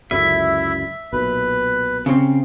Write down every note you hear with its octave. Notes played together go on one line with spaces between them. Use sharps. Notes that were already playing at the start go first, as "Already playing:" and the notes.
C#2 F#2 D3 E4 E5
B1 A#2 B4
C#3 C4